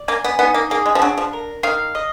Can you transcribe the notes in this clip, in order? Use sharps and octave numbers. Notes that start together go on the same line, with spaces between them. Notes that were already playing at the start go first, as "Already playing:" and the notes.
Already playing: D5
A#3 G#5
B3
B3 D#4
A#3
A#3 G#4
G#3
F3
F#3 D4
F3
A#4
D#3 F5
D#5